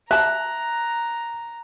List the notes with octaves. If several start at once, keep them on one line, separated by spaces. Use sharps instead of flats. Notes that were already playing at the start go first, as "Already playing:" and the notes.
E5 A5 A#5 F#6